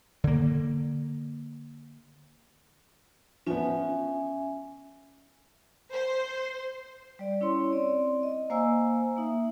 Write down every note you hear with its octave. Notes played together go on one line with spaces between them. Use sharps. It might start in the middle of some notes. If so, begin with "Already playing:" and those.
D3 A#3
F3 B3 C#4 E5 G#5
C5
G3 D5
C#4 E4 C#5 C6
C4 D5
D#5
A#3 C5 F5 G#5 A#5 E6
A#3 D#4 E5